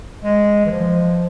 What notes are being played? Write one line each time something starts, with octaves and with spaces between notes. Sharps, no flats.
G#3
E3
F3